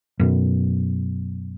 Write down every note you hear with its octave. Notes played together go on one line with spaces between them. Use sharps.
F#2 B2